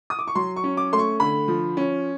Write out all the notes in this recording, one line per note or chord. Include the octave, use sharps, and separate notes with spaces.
D#6
D6
C#6
F#3 C6
C#6
C#4
D6
A3 C6
C#6
D3 B5
F3
C#4